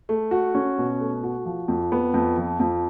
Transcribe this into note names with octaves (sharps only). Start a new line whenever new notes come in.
A3
F#4
C#4
B2
A3
F#4
F3
F2
B3
F2
F3
F2